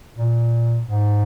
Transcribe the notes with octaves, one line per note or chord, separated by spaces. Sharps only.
A#2
G#2